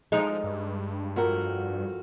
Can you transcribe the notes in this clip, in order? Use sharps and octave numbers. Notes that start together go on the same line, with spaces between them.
F3 G#3 D#4
G2
F2 F#4 A#4